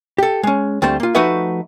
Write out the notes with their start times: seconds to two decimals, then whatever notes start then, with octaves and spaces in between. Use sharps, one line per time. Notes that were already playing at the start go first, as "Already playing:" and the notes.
0.18 G4 A4
0.43 G#3 C#4
0.82 D2 G3 A3 C4 C5 A5
1.00 A#3 F4
1.15 F3 A3 D#4 F#4 B4 E5